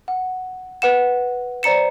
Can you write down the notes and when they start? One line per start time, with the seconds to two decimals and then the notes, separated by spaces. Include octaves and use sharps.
0.08 F#5
0.82 B4 F#5 E7
1.63 C5 D5 A#5 C#7 E7